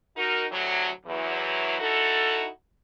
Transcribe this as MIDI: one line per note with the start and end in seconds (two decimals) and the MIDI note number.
0.17 0.45 63
0.17 0.45 66
0.17 0.45 70
0.51 0.88 38
0.51 0.88 45
0.51 0.88 48
0.51 0.88 54
1.06 1.79 40
1.06 1.79 52
1.06 1.79 54
1.79 2.48 63
1.79 2.48 64
1.79 2.48 66
1.79 2.48 69